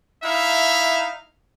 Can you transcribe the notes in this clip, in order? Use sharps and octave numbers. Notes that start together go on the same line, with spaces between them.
D#4 E4 E5 F5